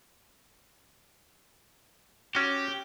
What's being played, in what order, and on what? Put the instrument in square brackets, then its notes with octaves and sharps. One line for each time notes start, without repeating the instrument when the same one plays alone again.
[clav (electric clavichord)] C#4 F#4 [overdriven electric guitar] G4